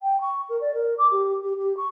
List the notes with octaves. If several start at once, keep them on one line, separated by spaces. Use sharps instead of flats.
G5
C#6
A#4
D5
A#4
D6
G4
G4
G4
C#6